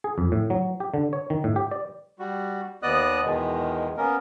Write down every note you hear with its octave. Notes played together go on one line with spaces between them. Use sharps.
G#4
F2
A2
F#3
G4
D3
C#5
D#3
A2
G4
D5
G3 F#4
D#2 B3 D5 D#5 D#6 F#6
E2 B2 D#3 G#3
A#3 B3 C#4 A#4